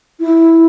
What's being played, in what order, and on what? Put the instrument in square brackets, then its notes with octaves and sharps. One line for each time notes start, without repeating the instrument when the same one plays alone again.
[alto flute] E4